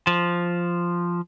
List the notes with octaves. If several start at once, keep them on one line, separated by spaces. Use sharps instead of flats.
F3